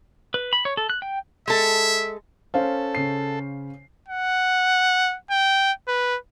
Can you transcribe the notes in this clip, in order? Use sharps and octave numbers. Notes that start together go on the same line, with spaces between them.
B4
B5
C#5
A4
F#6
G5
G#3 A4 E5
C#4 A4 C5 F5
C#3 C7
F#5
G5
B4